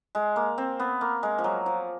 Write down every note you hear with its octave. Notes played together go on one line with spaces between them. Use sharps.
G#3
A#3
C4
B3
A#3
G#3
F3
F#3
F3